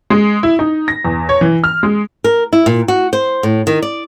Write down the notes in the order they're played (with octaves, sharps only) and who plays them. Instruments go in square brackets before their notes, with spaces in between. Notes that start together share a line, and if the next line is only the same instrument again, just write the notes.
[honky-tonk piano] G#3
E4
D#4
A#6
E2
C#5
E3
F6
G#3
[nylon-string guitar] A#4
E4
A#2
F#4
C5
A2
D#3
D5